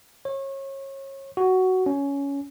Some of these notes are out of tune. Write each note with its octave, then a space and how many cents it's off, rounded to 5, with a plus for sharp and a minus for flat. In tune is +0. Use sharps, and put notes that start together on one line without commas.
C#5 -30
F#4 +10
C#4 +15